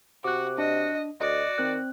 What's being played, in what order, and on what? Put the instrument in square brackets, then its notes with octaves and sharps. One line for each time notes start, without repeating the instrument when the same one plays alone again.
[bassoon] C3 [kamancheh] F#4 [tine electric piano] D6 F#6
[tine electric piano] D4 [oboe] F#4 [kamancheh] D#5
[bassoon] D2 [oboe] F#4 [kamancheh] D5 [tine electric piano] D#5
[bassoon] D#3 [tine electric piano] C4 F#6